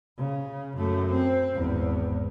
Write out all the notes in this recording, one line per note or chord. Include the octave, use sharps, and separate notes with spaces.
C#3
F#2 A3
C4
G#1 E2